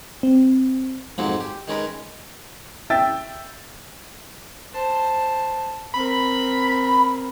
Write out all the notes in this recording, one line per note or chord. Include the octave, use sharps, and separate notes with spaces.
C4
F2 G#2 D#3 F#3 G#3 A#3
G4
D#3 G#3 C#4 A#4 B4
E5 G5 E6 A6
C5 A5
C4 A#4 B5